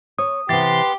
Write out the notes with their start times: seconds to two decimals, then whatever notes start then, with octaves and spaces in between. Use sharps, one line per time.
0.19 C#5 D#6
0.49 C3 E3 B3 G4 C6 A6